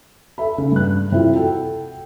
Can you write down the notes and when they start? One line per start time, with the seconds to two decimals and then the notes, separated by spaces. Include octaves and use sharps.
0.38 A4 E5 B5
0.58 C#3
0.72 G2 F#6
1.12 C3 E4 F4
1.35 F#4 A4 G5